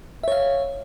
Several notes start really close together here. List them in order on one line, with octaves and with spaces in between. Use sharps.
E5 C#5 F5